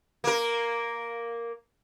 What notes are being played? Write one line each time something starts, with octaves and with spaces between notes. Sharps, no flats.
A#3 A#4